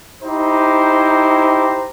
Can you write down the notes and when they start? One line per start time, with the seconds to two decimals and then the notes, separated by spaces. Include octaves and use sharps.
0.23 D#4 E4 G4 C5 A#5